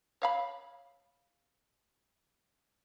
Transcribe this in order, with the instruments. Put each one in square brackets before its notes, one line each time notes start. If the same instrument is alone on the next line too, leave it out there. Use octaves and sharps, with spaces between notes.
[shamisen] C#5 F5 B5